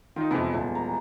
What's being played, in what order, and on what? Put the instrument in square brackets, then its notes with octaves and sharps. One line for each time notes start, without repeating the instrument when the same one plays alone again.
[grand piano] D#3 D#4 [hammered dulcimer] F4
[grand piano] F2 C3 [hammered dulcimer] E3 G#3 B3
[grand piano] D#1
[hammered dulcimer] A#5